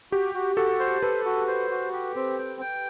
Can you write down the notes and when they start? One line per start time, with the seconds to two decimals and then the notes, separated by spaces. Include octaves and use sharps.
0.12 F#4 G4
0.34 F#4
0.57 F#4 A4
0.80 C5
1.02 A4 B4
1.25 F#4
1.48 C5
1.70 F#4
1.93 G4
2.16 C4
2.38 G5
2.61 G5